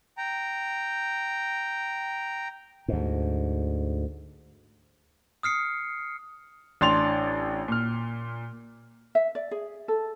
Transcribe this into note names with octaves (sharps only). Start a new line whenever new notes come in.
G5 A#5
D2 G#2
D#6 F6 C7 C#7
A1 D4 C6 A6 F7
A#2 F6
E5
D5
G#4
A4